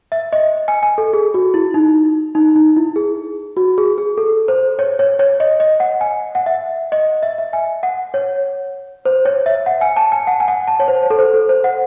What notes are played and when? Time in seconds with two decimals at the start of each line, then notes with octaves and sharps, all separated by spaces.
0.12 E5
0.33 D#5
0.68 G#5
0.83 G#5
0.98 A4
1.13 G#4
1.34 F#4
1.54 E4
1.74 D#4
2.35 D#4
2.55 D#4
2.76 E4
2.96 G#4
3.57 F#4
3.78 G#4
3.98 G#4
4.18 A4
4.48 C5
4.79 C#5
4.99 C#5
5.19 C#5
5.40 D#5
5.60 D#5
5.80 F#5
6.01 G#5
6.35 F#5
6.46 E5
6.92 D#5
7.23 E5
7.38 E5
7.53 G#5
7.83 F#5
8.14 C#5
9.06 C5
9.25 C#5
9.46 E5
9.66 F#5
9.81 G#5
9.97 A5
10.12 G#5
10.27 F#5
10.40 G#5
10.48 F#5
10.67 A5
10.80 C#5
10.88 C5
11.10 A4
11.19 C5
11.34 A4
11.49 C5
11.64 F#5